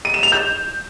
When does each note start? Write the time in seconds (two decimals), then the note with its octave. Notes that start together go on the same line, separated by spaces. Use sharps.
0.05 D#7
0.14 E7
0.23 F7
0.32 G6